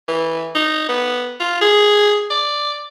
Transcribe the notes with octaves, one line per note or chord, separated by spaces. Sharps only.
E3
D#4
B3
F4
G#4
D5